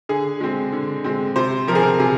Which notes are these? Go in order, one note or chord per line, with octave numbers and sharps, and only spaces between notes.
D3 G#4
G#3 C4
D3
G#3 C4
C3 C5
F3 A#4
C4 G#4
A#4
C3 G#4